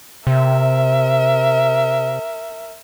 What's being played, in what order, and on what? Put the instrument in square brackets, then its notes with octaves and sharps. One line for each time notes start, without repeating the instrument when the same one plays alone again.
[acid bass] C3 [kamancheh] A#4 E5